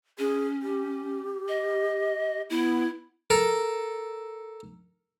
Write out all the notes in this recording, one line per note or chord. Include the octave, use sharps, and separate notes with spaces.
C#4 G#4
G4
D#5
B3 E4
A4 A#4